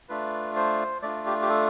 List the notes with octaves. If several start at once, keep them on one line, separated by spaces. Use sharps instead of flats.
A3 D4 F4 B4
C5
A3 D4 F4 D5
G4
G4
A4